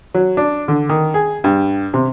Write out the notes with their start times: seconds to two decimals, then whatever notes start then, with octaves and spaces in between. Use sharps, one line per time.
0.14 F#3
0.37 D4
0.68 D3
0.89 D#3
1.14 G#4
1.44 G2
1.94 C3